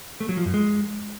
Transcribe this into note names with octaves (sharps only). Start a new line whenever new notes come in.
A3
F#3
F3
F#2
G#3